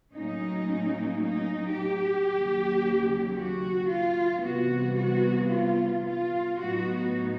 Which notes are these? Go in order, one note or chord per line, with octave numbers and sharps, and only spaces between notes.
A2 F#3 A#3 C#4 D#4
D#4
G4
D#2 C#3 F#3
F#4
F4
C3 E3 G3 B3 F#4
F#4
F4
F4
A2 F#3 B3 D#4 F#4